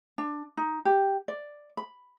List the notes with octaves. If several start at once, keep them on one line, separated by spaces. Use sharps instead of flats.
D4
D#4
G4
D5
B5